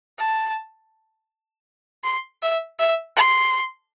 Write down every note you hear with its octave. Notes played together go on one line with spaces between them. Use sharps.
A5
C6
E5
E5
C6